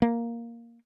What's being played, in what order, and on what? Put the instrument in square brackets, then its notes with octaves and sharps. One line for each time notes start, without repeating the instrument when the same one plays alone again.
[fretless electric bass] A#3